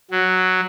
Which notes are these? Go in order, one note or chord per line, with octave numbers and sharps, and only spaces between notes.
F#3